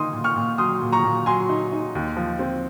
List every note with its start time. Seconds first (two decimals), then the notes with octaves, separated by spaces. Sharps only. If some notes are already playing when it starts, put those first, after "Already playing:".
Already playing: A#3 D#4 C6 D#6
0.13 A#2
0.24 C#6 F6
0.36 A#2
0.58 F#3 C6 D#6
0.82 A#2
0.92 A#5 C#6
1.04 A#2
1.26 F#3 G#5 C6
1.49 D#4
1.72 D#4
1.95 D#2
2.17 F3
2.39 C4